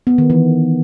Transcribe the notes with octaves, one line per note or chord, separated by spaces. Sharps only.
B3
D#3
E3